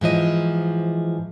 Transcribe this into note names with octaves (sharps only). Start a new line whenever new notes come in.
G#2 E3 F3 D#5